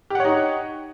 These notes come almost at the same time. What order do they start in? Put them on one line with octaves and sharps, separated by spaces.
G4 F#5 C#5 D#4